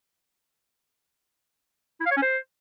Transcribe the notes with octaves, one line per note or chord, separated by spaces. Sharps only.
E4
F5
C#5
C#4
C5